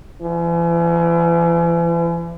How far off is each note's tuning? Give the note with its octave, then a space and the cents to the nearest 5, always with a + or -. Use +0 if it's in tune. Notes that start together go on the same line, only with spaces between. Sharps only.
E3 +40